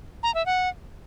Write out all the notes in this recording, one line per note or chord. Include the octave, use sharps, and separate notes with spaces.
A#5
E5
F#5